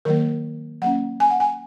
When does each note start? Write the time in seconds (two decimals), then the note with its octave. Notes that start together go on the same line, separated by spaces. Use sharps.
0.05 D#3 F#3 A#3 A#4
0.82 F#3 A#3 C#4 F#5
1.20 G#5
1.30 F#5
1.40 G#5